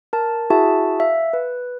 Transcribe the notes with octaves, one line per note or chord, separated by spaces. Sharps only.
A#4 A5
E4 F#4 G#4 E5 F#5 A5
E5 F5
B4